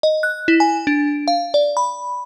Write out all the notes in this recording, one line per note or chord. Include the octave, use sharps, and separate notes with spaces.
D#5
F#6
E4
G#5
D4
F5
D5
B5